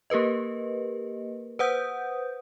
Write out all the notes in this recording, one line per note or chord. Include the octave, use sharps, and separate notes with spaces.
A#3 G4 A#4 B4 D#5
B4 C5 F#5 D#6 G6